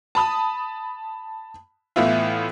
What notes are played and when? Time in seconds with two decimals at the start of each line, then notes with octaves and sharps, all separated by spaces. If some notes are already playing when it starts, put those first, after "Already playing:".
0.15 A5 B5 D#6
1.96 A2 E3 B3 E4 F4